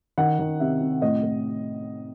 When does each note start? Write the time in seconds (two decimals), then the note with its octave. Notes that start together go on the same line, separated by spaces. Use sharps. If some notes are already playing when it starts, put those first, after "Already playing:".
0.18 D#3 F#5
0.39 D#3
0.60 C3 E5
0.81 C3
1.01 A2 D#5
1.23 A2